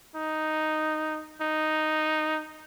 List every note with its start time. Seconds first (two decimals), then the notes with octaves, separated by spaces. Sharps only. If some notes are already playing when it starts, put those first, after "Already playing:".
0.15 D#4
1.41 D#4